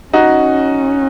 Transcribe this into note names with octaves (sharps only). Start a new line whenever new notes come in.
C#4 D#4 F#4